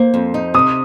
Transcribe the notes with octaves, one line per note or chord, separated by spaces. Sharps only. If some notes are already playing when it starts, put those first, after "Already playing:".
Already playing: A#3 C5
F2
D#4
C3 D#6